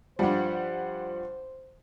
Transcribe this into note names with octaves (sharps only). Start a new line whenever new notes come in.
G2 F3 G3 C5 F#5